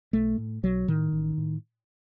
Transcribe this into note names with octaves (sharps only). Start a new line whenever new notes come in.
B1 A3
A2
B1 F#3
A2 D#3
A1
A2